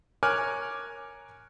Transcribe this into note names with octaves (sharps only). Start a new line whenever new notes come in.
A#4 C#5 G#5 D6 F6 F#6